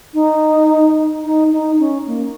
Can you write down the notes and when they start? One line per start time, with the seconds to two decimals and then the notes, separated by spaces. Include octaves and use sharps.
0.14 D#4
1.24 D#4
1.52 D#4
1.79 C#4
2.07 A#3